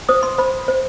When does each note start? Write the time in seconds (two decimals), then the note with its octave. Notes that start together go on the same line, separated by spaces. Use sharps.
0.09 C5 D#6
0.23 C6
0.38 C5 B5
0.68 C5